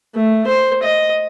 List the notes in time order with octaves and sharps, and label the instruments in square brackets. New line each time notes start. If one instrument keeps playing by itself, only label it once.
[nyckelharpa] A3
C5
D#5